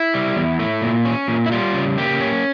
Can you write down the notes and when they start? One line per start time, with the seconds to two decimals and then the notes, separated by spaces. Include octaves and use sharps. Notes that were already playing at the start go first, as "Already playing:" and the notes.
Already playing: E4
0.14 G3
0.37 E2
0.59 A3
0.82 A#2
1.05 C#4
1.28 A#2
1.46 E4
1.52 G3 F4
1.74 C#3
1.98 A#3 G4
2.20 C#4